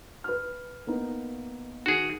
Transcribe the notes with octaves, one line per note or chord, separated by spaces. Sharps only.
B4 F6
A#3 B3 D#4
D#3 F#4 G#4